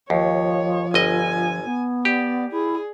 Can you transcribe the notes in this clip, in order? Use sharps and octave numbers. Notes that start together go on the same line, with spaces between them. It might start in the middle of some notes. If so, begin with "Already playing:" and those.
D#2 F3 C#5
G1 D#5 G#5
B3
G4 D5
E4 G#4